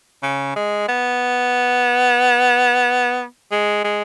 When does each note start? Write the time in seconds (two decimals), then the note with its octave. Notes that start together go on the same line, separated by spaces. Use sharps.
0.23 C#3
0.56 G#3
0.89 B3
3.51 G#3
3.84 G#3